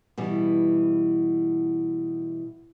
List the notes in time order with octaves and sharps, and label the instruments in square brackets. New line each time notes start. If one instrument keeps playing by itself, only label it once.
[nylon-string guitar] B2 E3 G3